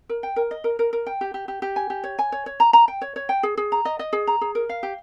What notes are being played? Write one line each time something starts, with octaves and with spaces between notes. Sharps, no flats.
A#4
G5
A#4
D#5
A#4
A#4
A#4
G5
G4
G4
G4
G4
G#5
G4
C#5
G#5
C#5
C#5
A#5
A#5
G5
C#5
C#5
G5
G#4
G#4
A#5
D#5
D#5
G#4
A#5
G#4
A#4
F5
G4